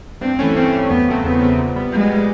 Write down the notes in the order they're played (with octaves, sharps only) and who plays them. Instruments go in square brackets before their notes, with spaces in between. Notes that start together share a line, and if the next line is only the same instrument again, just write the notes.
[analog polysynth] G2 [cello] C4
[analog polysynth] E3 A3 C#4
[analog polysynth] G2 [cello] C4
[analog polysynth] E3 A3 C#4
[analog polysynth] E2 [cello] B3
[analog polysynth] C#3 F#3 A3 C4
[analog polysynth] E2 [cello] B3
[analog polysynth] C#3 F#3 A3 C4
A#2
G3 B3
[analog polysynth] A#2 [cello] G#3
[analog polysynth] G3 B3